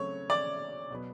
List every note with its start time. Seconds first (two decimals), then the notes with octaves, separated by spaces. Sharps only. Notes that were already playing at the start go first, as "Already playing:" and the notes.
Already playing: C#3 F#3 A3 C4 C#5
0.30 D5 D6
0.90 B2 F#3 B3